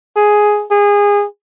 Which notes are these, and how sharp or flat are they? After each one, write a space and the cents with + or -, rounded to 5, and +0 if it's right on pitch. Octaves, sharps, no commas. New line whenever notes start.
G#4 +5
G#4 -25